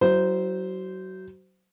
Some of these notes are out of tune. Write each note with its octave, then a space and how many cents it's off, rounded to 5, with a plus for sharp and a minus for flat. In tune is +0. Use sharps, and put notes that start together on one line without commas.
F#3 +25 E4 +0 C5 -15